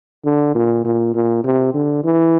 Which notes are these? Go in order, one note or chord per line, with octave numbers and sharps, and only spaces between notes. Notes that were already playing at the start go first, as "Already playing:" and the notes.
D3
A#2
A#2
A#2
C3
D3
E3